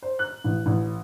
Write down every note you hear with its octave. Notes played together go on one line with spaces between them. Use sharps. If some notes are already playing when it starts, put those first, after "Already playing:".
C5
F#6
A1
A1